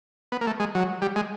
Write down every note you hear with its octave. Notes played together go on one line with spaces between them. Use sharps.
B3
A#3
A3
G#3
F#3
G3
G#3